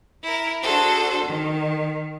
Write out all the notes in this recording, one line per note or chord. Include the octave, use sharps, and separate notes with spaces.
E4 A#4
D4 F#4 G#4 A4 C5
D#3